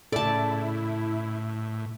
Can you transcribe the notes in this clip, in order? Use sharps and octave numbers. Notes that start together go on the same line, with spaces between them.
A2 C#3 E4 A4 D5 A5